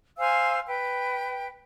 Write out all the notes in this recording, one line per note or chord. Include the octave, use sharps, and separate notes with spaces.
C5 F5 G#5 E6
B4 G5